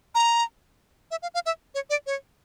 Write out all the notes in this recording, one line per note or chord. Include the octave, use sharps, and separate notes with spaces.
A#5
E5
F5
F5
E5
C#5
D5
C#5